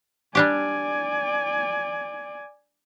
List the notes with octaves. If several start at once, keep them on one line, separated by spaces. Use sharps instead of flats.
G3 D4 G4 D5 G#5